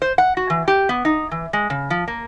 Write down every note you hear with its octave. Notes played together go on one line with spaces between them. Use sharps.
C5
F#5
F#4
E3
G4
B3
D#4
E3
G#3
C#3
F3
A#3